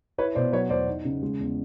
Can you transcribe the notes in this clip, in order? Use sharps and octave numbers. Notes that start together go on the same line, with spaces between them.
E4 B4 C#5
B2 C5 D5
F#3 B4 C#5
E2 C5 D5
D#4
C#3
G#3
E2